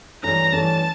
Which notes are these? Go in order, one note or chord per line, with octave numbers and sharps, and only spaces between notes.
G2 E3 A3 C#4 A#5
G2 E3 A3 C#4 A5